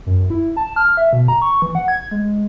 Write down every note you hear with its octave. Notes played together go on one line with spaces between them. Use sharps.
F#2
E4
A5
F6
E5
B2
A#5
C#6
E3
F#5
G#6
G#3